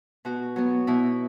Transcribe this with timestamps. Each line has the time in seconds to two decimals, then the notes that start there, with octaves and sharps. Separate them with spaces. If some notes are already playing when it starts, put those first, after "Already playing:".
0.25 B2 F#4
0.56 F#3 B3
0.87 B2 E4